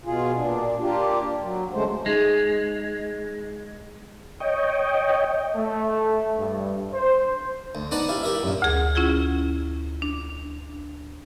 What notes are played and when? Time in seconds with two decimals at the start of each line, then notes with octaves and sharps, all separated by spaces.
0.05 B2 F4 G#4
0.37 A#2 D4
0.81 A#3 D4 F4 G4
1.42 F#3
1.73 C#3 G#3 A3 C5
2.06 G#3 D#4 G#4 F7
4.40 C#5 D#5 G5
5.55 A3
6.37 G2
6.93 C5
7.75 D2
7.91 B3 D#4 D5 F#5 A5 A#5
8.09 E4 G4 F5
8.23 E4 G4 A#4 E5
8.43 F#2 A#2
8.62 D2 G#4
8.95 C#4 E4 F4 G#4
10.02 D4